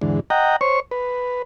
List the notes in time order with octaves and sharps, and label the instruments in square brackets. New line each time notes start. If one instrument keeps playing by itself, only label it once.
[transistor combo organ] E2 G#2 D3
D#5 F#5 G5 A#5
C5 C#5 C#6
B4